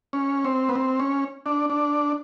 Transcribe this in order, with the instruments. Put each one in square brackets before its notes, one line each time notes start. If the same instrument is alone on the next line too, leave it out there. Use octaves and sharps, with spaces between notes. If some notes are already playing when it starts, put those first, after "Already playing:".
[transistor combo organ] C#4
C4
B3
C4
C#4
D4
D4